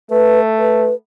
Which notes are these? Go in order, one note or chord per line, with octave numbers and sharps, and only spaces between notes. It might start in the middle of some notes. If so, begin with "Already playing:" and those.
A3 B4
B4